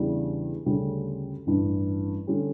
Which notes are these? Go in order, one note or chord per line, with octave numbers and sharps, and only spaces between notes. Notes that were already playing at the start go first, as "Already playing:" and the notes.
Already playing: E2 C#3 E3 G3 D4
D2 C#3 G3 C#4
A1 G2 E3
D3 G3 C#4 G4